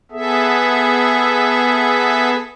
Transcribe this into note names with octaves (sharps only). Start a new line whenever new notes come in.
B3 G#4 A4 E5